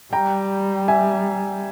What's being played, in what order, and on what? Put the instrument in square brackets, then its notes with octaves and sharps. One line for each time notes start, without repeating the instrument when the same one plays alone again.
[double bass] G3 [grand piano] G5 A#5
[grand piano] E5 G#5